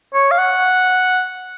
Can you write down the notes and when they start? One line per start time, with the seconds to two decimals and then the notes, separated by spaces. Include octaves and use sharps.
0.14 C#5
0.31 F5
0.38 F#5